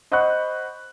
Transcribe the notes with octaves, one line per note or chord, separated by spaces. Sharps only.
C5 D#5 F#5 B5 C#6 F#6